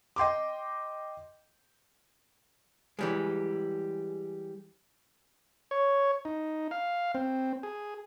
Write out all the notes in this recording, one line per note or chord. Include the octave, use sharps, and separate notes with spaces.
D#5 G5 C6 D6
E3 G3 G#3
C#5
D#4
F5
C4
G#4